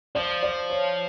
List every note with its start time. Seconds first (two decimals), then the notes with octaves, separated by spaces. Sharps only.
0.15 F3 D5
0.43 D5
0.70 C#5